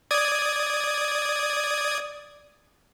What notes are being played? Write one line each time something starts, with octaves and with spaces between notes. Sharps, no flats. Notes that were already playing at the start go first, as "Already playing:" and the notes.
D5 D#6 G#6